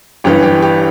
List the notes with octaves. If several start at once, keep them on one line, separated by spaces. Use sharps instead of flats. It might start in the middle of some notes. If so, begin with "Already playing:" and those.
G1 G2 E3 G4
G4
G4